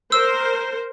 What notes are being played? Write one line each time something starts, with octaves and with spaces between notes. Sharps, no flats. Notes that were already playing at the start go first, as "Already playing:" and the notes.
A#4 C5 E6